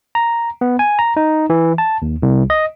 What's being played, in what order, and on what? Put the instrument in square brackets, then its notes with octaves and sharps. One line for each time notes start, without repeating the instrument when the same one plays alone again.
[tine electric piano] A#5
B3
G#5
A#5
D#4
E3
A5
D#2
C2
D#5